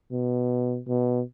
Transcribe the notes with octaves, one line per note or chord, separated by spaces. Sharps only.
B2
B2